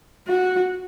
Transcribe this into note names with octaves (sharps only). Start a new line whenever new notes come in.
F#4